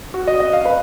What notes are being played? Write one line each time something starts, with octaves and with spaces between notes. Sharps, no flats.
F#4
D#5
D#5
F5
B4